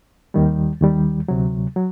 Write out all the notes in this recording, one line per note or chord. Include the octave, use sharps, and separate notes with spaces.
D#2 D#3 G3
D#2 D#3 G3
D2 C3 F#3
F#3